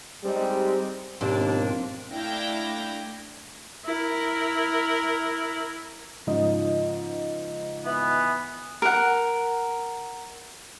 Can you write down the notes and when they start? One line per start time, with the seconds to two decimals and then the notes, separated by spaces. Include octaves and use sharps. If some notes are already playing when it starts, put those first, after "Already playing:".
0.24 G3 G#3 C4 D#4 G4
1.21 D#2 G#2 B2 F3 A#3 C4 D4
2.12 A3 D4 E4 F5 G5 A#6
3.86 E4 A#4
6.27 G#2 C#3 F3 D#4 D#5
7.84 E3 B3
8.82 A#4 F#5